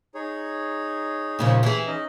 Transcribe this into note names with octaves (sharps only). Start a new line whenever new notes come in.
D#4 G#4 C#5
A#2 C#3 F3
E3 G#4
C#4 D#4 D#5